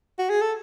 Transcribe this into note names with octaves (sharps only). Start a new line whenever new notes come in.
F#4
G#4
A4